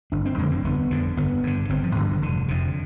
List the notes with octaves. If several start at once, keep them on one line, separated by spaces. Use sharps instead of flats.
G1 D4
C4
F2 D3 G#3
C4
G1 B3
F2 D3
G1 B3
G2 D3
G1 C4
F3
G2 D3 D#3
D#3
F1 D3
F2 C3